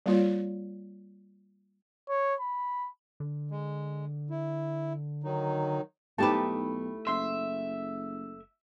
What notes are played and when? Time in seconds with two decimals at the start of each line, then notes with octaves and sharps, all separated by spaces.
0.06 G3 A#3 F4 C#5
2.09 C#5
2.40 B5
3.20 D3
3.51 G#3
4.30 E4
5.24 D#3 F#3 D#4
6.18 B1 A3 D#4 E4 G4 B4 A5
7.07 F#1 E5 C6